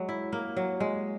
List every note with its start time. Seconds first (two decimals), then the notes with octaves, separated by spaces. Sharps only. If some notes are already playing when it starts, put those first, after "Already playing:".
Already playing: F#3 G#3
0.09 E4
0.33 A#3
0.57 F#3
0.80 G#3